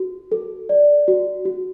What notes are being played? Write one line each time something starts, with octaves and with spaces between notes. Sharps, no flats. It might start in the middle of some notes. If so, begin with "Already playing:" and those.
Already playing: F#4
A4
D5
F#4
F#4